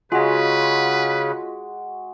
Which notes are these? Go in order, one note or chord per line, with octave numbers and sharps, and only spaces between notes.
C#3 G#3 F4 F#4 B4 D#5 G#5